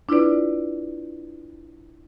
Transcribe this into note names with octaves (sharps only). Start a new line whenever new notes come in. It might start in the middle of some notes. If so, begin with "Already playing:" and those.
D4 E4 F4 B4 D5